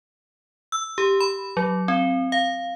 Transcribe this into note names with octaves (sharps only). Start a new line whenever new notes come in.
E6
G4
B5
F#3
C4
F5